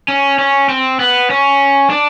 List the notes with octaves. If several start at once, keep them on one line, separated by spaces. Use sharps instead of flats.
C#4
C#4
C4
B3
C#4
D4